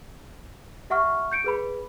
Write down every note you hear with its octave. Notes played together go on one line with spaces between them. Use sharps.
G4 E5 F#5 C#6 F6
G6 C#7 D7
G#4 B4 B5